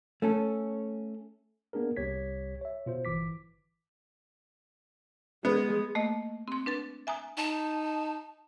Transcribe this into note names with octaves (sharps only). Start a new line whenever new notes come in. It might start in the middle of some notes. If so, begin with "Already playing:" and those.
A3 C#4 A4
A#3 B3 D4 G#4 A#4
C2 G4 C#5 G#6 B6
C#5 E5
B2 F4 C5
G1 E3 D6 B6
G#3 B3
A3 A#3 D#5
C4 C6
D4 B4 A6
E5 G#5 A#5 D#6
D#4 A5